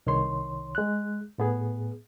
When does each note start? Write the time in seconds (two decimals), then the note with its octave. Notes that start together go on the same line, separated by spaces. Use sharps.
0.07 C2 D#3 C#5 C6
0.75 G#3 F#6
1.38 A2 B3 G#4